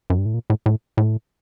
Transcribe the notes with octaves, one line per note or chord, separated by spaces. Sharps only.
F#2
G2
A2
A#2
A2
A2
A2